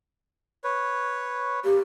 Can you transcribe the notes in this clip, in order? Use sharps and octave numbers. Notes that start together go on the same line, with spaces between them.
B4 C#5
A#3 G4